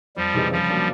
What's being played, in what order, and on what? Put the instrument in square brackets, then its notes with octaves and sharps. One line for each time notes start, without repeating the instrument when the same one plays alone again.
[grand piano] F2 [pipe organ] F3 G3
[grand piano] C3 E3 G#3
[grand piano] C#3 [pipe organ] F3 G3
[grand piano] F#3 A#3 D4